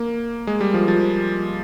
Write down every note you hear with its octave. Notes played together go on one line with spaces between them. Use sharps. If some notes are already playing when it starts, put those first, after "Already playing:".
Already playing: A#3
G#3
G3
F3
F3